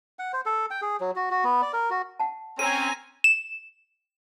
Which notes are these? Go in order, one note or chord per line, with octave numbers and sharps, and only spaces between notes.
F#5
C5
A4
G5
G#4
F#3
F#4
F#4
B3
D5
A#4
F#4
F#5 A5
C4 C#4 A4 G#5 A#5 D#7
E7